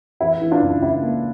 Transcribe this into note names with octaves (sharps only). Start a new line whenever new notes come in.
E3 E4
E3
D4 F4
C#2
C#2 E4
A#3